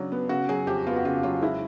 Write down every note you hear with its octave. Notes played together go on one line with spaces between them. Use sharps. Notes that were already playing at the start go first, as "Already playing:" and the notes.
Already playing: C#3 F#3 D4
B3
C#3 F#4
F#3 G#4
F2 G4
B3 F4
F#4
C#3 F4
F#3 F4
G#3 E4